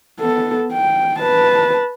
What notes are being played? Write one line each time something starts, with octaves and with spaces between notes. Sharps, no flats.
B3 A4
G5
B4 A5